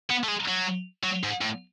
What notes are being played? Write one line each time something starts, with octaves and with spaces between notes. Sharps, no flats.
B3
A3
G#3
F#3
F#3
G#2
A2